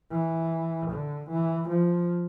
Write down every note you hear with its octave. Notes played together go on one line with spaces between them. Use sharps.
E3
D3
E3
F3